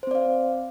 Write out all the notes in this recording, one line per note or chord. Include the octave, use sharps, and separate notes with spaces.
C4 C5 D5 F5